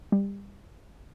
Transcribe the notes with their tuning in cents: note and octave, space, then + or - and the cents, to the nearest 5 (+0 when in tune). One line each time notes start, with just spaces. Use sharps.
G3 +25